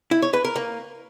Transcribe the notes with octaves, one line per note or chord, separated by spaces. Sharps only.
E4
C#5
B4
A#4
A#3